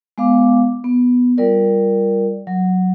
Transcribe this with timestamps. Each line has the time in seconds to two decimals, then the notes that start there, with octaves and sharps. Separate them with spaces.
0.18 G#3 B3 F5 D6
0.84 B3
1.38 G3 F4 A#4 D5
2.47 F#3